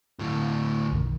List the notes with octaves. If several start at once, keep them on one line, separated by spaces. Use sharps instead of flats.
D2 A2
B1 F#2 D#3